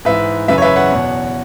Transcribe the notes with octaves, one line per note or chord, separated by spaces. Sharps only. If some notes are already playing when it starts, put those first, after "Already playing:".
G#2 E3 B4 E5
F#2 C#3 E3 B4 E5
C#5
B4 E5
C#5 F#5
E2 B2